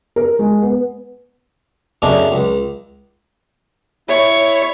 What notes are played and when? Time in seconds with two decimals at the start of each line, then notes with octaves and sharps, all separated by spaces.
0.16 A#4
0.39 G#3
0.62 B3
2.02 F#2 C#3 A3 D4 D#4
2.32 C#2
4.09 E4 C#5